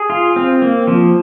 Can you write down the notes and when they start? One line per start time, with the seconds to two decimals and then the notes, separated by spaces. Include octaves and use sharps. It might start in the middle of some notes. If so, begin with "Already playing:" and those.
Already playing: G#4
0.10 F4
0.36 C4
0.62 A#3
0.87 F3